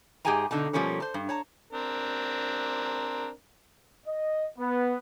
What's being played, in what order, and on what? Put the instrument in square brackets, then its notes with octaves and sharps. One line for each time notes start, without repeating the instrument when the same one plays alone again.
[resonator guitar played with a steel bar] G#2 G4 G#4 G5 G#5 A#5
B2 D3 D#4 A5
B2 F3 G3 A#3 C#4 A4
C5 A5
G2
C#5 A5 A#5
[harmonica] C4 D4 A#4
[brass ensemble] D#5
B3